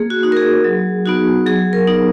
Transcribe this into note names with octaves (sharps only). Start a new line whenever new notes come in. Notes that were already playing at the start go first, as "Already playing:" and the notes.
Already playing: A#3 G#4
F#4
D#4 F#4
A#4
G#4
F#3
B3 D#4 F#4
F#3 G#4
A#4
B3 D#4